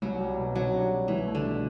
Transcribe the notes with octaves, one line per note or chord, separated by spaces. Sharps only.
C2 F#3
G3
B2
C3 F#3
D4
G3
C2 E3
A3
D3
B2